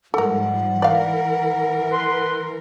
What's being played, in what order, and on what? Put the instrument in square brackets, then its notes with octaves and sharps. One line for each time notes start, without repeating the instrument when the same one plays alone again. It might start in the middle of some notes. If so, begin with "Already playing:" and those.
[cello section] G#2 F3 G3 [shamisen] A4 A#4 [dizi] F#5
[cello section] E3 A#4 [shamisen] D5 F5
[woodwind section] B4 C6